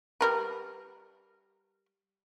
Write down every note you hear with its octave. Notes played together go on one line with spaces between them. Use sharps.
G3 A#4 B4